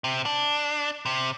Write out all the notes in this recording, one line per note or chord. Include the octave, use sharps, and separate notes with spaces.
C3
D4
C3